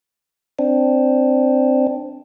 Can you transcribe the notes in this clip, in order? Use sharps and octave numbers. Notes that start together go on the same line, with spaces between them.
C4 D4